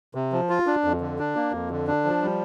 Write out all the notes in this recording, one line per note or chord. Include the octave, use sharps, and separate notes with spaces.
C3
F3
F4
D4
F2
D3
D4
A#3
F2
D3
D4
F3
G3